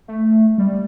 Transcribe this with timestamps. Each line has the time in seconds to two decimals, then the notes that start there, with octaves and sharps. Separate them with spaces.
0.08 A3
0.58 G3